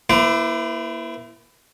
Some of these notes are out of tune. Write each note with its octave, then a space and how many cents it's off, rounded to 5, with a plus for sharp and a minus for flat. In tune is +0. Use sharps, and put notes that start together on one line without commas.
A#3 +25 E4 +10 C5 -40